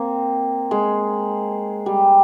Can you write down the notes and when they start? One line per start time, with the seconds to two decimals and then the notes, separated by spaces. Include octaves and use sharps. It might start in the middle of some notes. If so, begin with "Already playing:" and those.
Already playing: A#3 C4
0.71 G#3
1.86 G3